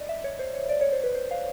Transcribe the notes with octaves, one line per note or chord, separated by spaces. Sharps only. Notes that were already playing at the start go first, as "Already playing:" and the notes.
Already playing: D5 D#5
E5
C#5
C5
C#5
D5
C#5
C5
B4
C5
F5